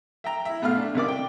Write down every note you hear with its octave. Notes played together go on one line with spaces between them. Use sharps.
E5 G5 A#5
E4 E5
B1 B2 A3 F5 F6
D4
C2 D#3 D5 D6
G5